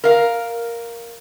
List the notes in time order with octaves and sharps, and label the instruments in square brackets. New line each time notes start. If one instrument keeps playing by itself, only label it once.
[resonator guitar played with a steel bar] A#4 F5